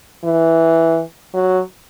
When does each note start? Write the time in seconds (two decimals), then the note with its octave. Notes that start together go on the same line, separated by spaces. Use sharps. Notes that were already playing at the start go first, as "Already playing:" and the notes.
0.24 E3
1.34 F#3